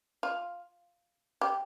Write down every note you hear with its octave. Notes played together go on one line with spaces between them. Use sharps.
F4
G4